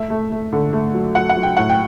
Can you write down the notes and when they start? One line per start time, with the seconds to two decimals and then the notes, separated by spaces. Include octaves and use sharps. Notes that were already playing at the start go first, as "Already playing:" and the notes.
Already playing: A3 E5
0.10 A3
0.31 A3
0.53 D3
0.73 A3
0.94 F#3
1.15 F#3 F#5
1.29 F#5
1.37 F#3
1.43 G5
1.57 A2 F#5
1.70 G5